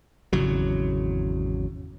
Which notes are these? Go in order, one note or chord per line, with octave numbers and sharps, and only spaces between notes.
G#1 E2 C#3 F#3